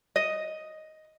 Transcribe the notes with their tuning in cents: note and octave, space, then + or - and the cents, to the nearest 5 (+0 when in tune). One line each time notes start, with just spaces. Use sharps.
D#5 +5